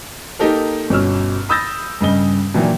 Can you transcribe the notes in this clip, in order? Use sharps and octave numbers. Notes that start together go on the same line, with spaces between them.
A#3 D#4 G4 A4 A#4
G1 B2 C#4 E6 F6
B5 D#6 E6 G6 A6 A#6
G2 C#3 D#5 G7
A#2 D#3 E3 F#3 A#3 D4